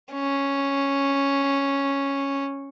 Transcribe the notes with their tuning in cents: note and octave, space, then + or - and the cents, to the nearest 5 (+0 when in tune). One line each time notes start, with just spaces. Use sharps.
C#4 +0